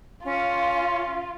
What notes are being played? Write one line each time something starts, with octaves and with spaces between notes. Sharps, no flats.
C#4 F4